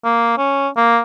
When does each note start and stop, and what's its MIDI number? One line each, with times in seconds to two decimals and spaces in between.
0.05 0.33 58
0.38 0.68 61
0.77 1.00 58